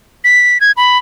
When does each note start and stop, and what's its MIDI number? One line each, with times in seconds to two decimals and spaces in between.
0.24 0.60 95
0.61 0.72 92
0.77 0.98 83